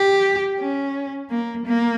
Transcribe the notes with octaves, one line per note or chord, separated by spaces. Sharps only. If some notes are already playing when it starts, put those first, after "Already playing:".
Already playing: G4
C#4
A#3
A#3